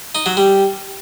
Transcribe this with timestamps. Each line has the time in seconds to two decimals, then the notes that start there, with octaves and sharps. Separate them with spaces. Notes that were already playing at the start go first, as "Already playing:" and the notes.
0.15 D#4
0.26 F#3
0.37 G3